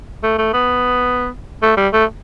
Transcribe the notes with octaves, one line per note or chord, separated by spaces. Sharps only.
A3
A3
B3
A3
G3
A3